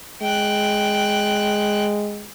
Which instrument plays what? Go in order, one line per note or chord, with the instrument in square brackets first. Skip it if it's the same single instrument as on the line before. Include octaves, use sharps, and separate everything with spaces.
[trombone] G#3 [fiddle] G5 F#6